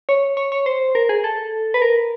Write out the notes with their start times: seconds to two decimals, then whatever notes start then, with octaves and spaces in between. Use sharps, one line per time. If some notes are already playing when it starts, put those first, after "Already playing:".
0.09 C#5
0.37 C#5
0.52 C#5
0.66 C5
0.95 A#4
1.09 G#4
1.24 A4
1.74 B4
1.82 A#4